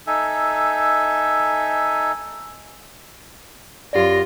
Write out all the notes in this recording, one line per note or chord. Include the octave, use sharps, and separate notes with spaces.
D#4 A4 E5 G#5
F#2 F4 G4 D5 A#6